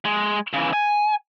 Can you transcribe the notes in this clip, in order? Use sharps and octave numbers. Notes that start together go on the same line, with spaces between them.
G#3
C#3 E3
G#5